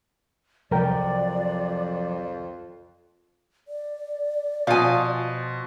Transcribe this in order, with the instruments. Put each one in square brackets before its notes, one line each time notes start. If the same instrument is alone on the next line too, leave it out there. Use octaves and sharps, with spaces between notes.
[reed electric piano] C2 A#4 G5 [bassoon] F2 [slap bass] F3 F#3 [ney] D5
[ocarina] D5
[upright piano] B2 [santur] F3 A5 D#6 [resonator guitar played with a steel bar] F5 G#5